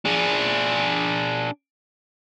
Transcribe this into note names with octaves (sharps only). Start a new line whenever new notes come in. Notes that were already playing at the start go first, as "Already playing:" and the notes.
D4 G#4